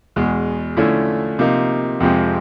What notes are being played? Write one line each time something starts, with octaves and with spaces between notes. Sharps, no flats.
E2 B2 G#3
D3 F3 A3 C#4 E4
C3 F3 A#3 D#4
F2 C3 F3 G#3 C4